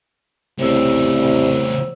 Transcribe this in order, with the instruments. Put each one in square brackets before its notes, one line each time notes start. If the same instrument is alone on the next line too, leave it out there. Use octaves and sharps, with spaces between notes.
[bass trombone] C2 [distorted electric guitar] A2 C#3 [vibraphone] C5 C#5 E6